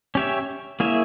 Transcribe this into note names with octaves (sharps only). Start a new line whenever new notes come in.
C#4 G4 C#5 E5
A#3 E4 G#4 C#5 E5